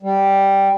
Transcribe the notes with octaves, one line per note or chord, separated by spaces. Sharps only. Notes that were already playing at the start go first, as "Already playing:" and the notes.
G3